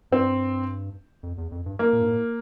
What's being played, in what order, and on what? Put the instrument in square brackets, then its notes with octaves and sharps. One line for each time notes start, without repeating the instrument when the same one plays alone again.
[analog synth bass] G2 [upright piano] C4
[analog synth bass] F2
E2
F2
G2
[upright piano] A#3
[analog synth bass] A#2
G2
A2